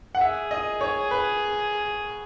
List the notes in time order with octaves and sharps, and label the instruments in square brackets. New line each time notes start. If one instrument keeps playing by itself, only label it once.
[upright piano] F#5
[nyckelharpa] G#4 [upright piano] E5
[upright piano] D#5
C#5
B4